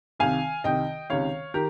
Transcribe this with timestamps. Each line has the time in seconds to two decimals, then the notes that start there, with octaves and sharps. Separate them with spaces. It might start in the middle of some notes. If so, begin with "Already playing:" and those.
0.19 C2 C3 D#3 F5 G#5
0.64 C2 C3 D#3 D#5 G5
1.10 C#2 C3 D#3 C#5 F5
1.54 D#3 G4 A#4